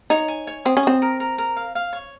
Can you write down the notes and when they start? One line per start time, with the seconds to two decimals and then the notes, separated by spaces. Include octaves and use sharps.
0.10 D#4 C#5
0.28 G#5
0.47 C#5
0.65 C4 D#6
0.77 C#4
0.83 C4 D#6
1.02 A#4
1.20 A#4
1.38 A#4
1.57 F5
1.75 F5
1.93 C#5